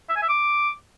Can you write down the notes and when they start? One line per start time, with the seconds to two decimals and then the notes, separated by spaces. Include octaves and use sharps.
0.09 E5
0.16 G#5
0.22 E5
0.29 D6